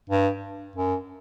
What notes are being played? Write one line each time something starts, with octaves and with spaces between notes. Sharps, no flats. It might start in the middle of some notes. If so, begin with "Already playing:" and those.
G2
F#2